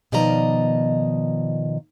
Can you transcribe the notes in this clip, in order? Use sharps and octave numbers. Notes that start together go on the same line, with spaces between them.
B2 D#3 F3 D5 D#5 A#5